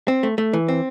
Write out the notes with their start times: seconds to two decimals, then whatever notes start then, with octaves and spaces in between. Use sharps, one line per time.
0.08 C4
0.23 A3
0.38 A3
0.53 E3
0.68 C4